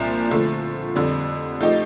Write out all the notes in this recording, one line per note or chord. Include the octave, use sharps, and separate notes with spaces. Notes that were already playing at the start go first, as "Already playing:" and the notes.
Already playing: C2 A#2 F3 D4
D3 F3 A3
F2 D3 G3 D4
F3 A3 D#4 G4